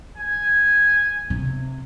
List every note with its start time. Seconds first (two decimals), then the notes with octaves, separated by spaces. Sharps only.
0.17 G#5
1.30 C3